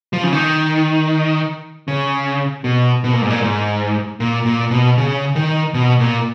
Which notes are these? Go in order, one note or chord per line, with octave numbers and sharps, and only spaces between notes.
F3
C#3
D#3
C#3
B2
B2
A#2
G#2
A#2
G#2
A#2
A#2
B2
C#3
D#3
B2
A#2